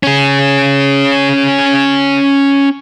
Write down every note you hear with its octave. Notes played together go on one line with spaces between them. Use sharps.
C#4 G#4